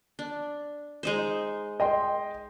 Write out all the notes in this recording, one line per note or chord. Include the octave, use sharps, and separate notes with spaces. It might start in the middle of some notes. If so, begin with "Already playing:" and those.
D4
G#3 D#4 C5
D#5 G5 C6